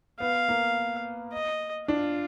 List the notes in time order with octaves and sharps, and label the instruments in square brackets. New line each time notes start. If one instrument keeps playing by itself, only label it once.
[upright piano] B3 [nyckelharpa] F5
[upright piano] A#3
[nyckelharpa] D#5
[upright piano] D4 [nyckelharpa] F4